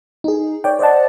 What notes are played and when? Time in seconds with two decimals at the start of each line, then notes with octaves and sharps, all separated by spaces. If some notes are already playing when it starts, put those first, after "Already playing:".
0.24 D#4 G#4
0.64 C#5 D5 G5
0.79 C5 D5 D#5 F#5 A5